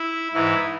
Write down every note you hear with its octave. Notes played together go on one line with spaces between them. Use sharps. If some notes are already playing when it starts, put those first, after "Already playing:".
Already playing: E4
G#2 E3 E4